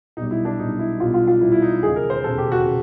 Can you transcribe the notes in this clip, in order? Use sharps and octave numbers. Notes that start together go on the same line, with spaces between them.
B1 B2 G3 D#4
E4
D4
B1 B2 G3 D#4
E4
B1 B2 G3 F4
F4
F4
B1 B2 G3 E4
E4
D#4
E1 D#2 C#3 G#4
A#4
C5
E1 D#2 C#3 A4
G4
F#4
C#3